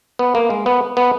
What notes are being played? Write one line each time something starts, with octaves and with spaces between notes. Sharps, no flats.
B3
A#3
G#3
B3
B3